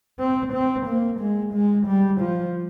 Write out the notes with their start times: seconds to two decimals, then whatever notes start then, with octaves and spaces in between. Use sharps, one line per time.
0.19 C4
0.53 C4
0.86 A#3
1.19 G#3
1.54 G#3
1.87 G3
2.21 F3